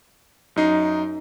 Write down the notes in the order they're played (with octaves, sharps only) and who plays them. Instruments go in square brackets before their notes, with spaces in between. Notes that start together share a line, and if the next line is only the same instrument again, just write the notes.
[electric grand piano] F#2 D#4 C7